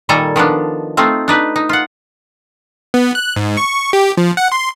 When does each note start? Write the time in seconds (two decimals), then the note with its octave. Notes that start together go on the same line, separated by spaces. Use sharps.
0.09 A#2 D#3 G3 A4 G#5 A#5
0.36 D#3 F3 B3 D4
0.97 A3 C4 D#4 F4
1.28 D4 D#4 B4
1.56 D#4
1.69 F4 F#5
2.94 B3
3.15 F#6
3.36 G#2
3.57 C#6
3.93 G4
4.17 F3
4.37 F#5
4.52 C6